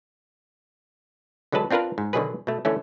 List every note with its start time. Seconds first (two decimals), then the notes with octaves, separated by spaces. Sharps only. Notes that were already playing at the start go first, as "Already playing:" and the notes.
1.52 D3 F#3 G#3 B4 A5
1.71 C4 D4 F4 A#4 B4 F5
1.98 G#2
2.13 B2 D3 D#3 F#3 G#4 B4
2.47 B2 A3
2.65 D3 E3 A3 C#4